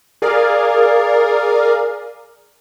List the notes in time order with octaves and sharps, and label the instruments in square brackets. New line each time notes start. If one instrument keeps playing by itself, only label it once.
[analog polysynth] G#4 A#4 D5 F5